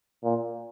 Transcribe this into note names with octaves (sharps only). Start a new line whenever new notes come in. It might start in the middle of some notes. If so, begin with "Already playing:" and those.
A#2